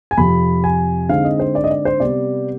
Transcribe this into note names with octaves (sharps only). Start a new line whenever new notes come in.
G#5
F2 C3 F3 B5
G#5
D3 G#3 C4 D#4 F5
D#5
C5
D5
D#5
D5
C5
C3 G3 B3 D5